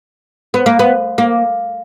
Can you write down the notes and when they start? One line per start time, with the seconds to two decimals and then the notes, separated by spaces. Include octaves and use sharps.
0.54 B3
0.66 A#3
0.79 B3
1.18 A#3